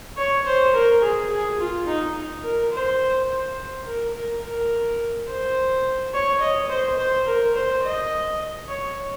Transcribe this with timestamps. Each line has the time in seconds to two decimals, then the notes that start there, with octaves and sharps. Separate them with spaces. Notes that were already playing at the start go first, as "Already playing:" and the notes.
0.17 C#5
0.46 C5
0.74 A#4
1.02 G#4
1.30 G#4
1.60 F4
1.87 D#4
2.43 A#4
2.72 C5
3.29 C5
3.86 A#4
4.14 A#4
4.42 A#4
5.27 C5
6.13 C#5
6.40 D#5
6.69 C5
6.98 C5
7.26 A#4
7.55 C5
7.82 D#5
8.68 C#5